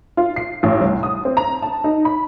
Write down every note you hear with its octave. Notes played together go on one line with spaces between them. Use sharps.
F4
C7
A1
C2
D#6
C4
A#5
A5
D#4
B5